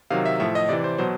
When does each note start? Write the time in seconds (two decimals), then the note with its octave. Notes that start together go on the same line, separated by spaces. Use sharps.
0.10 C3 D#3 F#3 F5
0.26 E5
0.40 A2 F3 E5
0.55 D#5
0.69 C3 E3 D5
0.84 C5
0.98 B2 F#3 C5